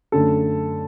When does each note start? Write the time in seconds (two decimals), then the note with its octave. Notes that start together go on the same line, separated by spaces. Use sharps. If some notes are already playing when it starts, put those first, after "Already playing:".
0.12 F#2 D3 A3 A4